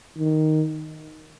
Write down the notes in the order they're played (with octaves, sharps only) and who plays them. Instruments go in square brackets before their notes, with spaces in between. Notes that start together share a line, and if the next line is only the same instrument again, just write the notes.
[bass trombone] D#3